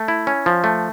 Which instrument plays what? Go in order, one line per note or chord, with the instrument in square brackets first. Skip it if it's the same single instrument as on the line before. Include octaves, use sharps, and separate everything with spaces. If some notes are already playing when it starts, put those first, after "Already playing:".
Already playing: [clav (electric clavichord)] A3
E4
C#4
F3
A3